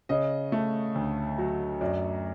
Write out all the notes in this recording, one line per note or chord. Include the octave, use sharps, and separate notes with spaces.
C#3 D#5
A3
D2
F#3
F#2 D5